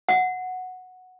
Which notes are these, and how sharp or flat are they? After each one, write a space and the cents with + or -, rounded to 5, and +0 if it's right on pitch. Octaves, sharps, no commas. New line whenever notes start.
F#5 -5